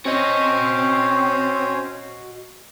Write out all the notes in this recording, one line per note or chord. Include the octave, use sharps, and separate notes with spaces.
C4 C#4 F#4 C5 C#5 D#5